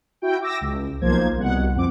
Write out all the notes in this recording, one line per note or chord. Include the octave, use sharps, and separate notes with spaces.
E4 F#4 G5
D6 E6 A#6
C#2
B1 F3 A#3 C5 G#6
C2 B2 F#5
F2 F3 C4 D6